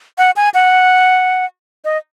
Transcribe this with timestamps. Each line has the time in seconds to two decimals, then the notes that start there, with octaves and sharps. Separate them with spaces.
0.18 F#5
0.36 G#5
0.54 F#5
1.85 D#5